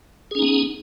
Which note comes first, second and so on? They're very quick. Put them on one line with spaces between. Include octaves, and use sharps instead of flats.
G#4 C#4 D#4 B3